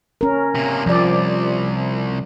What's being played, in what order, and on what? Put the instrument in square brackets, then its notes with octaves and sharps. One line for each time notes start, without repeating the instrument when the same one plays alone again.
[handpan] C#4 A#4
[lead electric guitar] C3 A#3
[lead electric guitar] C2 [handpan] F3 D5